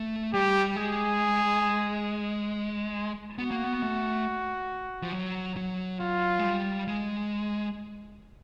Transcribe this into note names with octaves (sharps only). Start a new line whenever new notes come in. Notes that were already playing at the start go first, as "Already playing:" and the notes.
Already playing: A3
G3 G4
G#3 G#4
B3 F#4
A#3
B3
A3
F3
F#3
F#3
F#3 F4
G#3
G3
G#3